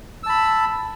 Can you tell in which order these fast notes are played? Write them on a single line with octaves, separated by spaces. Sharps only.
E6 A5 B5